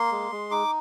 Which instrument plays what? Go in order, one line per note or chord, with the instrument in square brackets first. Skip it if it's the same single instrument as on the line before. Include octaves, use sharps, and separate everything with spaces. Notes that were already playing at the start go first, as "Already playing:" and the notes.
Already playing: [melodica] A#3 C6
G#3
G#3
D#4 D6